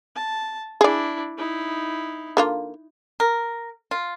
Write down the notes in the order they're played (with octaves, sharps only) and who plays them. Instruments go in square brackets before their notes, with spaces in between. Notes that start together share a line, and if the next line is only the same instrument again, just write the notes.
[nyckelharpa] A5
[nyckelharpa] D4 E4 [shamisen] G#4 D5
[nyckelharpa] D#4 E4
[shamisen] D3 A#3 F4
[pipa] A#4
F4